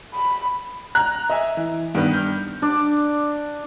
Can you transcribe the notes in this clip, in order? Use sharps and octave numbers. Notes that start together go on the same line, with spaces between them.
B5
A#5 F#6
D#5 E5 G#5
E3
G2 D#3 B3
F6 G6
D4 D5